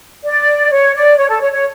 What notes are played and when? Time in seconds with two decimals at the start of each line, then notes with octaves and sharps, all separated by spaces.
0.25 D5
0.71 C#5
0.95 D5
1.17 C#5
1.29 A4
1.41 C#5
1.52 C#5